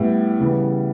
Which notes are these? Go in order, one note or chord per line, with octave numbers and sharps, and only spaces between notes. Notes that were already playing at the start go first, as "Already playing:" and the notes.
Already playing: A2 G3 B3 E4 G4
C#3 E3 G3 B3